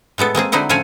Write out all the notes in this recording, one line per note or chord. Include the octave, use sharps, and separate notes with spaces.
A2 G#3 B3 A4
G#3 A#3 C4 G#4
D3 F#3 C4 D#4 E4 F#5
A2 F3 C4 C#4 C#5 G#5